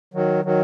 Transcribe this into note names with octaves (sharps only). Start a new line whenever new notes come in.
D#3 F#3
D#3 F#3